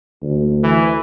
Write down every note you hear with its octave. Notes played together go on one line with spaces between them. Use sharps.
D2
E3